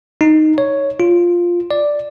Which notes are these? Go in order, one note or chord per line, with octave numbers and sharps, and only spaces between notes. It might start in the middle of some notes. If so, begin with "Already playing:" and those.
D#4
C#5
F4
D5